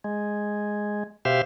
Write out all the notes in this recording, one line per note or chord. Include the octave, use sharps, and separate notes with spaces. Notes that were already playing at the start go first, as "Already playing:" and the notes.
G#3
B2 G4 C5 E5 F5